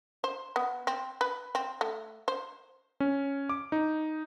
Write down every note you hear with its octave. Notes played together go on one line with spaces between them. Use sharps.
C5
B3
C4
B4
C4
A3
C5
C#4
D6
D#4